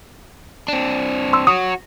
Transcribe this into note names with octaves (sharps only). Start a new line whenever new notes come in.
C4 D4
C6 E6
F#4 C#5 D#6